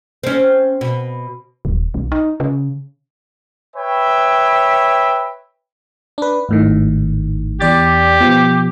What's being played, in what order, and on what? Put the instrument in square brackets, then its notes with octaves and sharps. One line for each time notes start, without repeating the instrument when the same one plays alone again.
[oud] C4 C#4
B2
[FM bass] D#1
B1
D#4
C#3
[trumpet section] B4 C#5 E5 G5
[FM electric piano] D4 B4
G#1 A2 D#3
[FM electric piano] E2 D5 A6 [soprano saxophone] G4
[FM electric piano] B2 F3